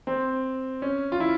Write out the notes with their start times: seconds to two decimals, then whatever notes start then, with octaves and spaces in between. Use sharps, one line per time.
0.07 C4
0.82 C#4
1.12 F4
1.20 E4